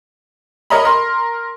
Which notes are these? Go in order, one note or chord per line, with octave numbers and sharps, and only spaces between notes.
A#4 C#5 D#5 A#5 B5
A#4 C6